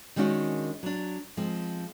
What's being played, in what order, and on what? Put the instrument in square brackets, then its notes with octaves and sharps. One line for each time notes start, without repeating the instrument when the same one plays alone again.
[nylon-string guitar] D#3 G#3 C#4 D4 F#4
F#3 D4
F3 G#3 C4